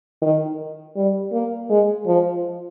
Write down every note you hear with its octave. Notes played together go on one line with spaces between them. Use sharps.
D#3
G3
A#3
G#3
F3